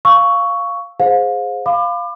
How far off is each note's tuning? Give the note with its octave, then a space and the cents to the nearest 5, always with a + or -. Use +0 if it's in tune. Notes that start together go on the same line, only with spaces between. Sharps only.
F5 -5 C#6 +10 E6 +0
G#4 +0 C5 +0 F5 +35
F5 +0 B5 +30 D6 +30